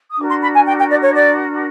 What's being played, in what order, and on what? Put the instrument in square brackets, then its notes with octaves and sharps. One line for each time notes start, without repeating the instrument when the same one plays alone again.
[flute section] D#6
D4 F#4 A#4 D6
C6
B5
G#5
G5
G5
D5
C#5
D5